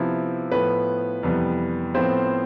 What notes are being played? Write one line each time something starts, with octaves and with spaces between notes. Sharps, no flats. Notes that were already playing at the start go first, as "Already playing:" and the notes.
Already playing: C3 F3 B3 E4
A2 F3 B3 B4
F2 C3 E3 G3 B3
A2 F3 B3 C4 F4 C5